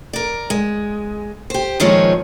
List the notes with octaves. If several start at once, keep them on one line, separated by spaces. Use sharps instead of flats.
A#4 D5
G#3
G4 C5
A#2 D#3 F3 G#3 C#4 C#5